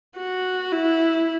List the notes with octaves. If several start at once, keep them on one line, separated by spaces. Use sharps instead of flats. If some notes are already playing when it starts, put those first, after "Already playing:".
F#4
E4